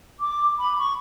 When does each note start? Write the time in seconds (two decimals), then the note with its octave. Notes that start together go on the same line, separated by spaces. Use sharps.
0.20 D6
0.59 B5
0.79 C#6